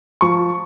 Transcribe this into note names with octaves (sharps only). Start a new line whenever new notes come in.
F3 C#6